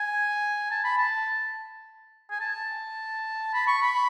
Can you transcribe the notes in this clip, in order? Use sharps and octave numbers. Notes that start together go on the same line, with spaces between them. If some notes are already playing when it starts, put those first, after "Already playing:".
Already playing: G#5
A5
B5
A5
G#5
A5
B5
C#6
B5